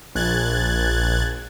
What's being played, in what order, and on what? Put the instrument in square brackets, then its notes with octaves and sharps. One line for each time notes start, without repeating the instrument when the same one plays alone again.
[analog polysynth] A#1 F#6 G#6 A6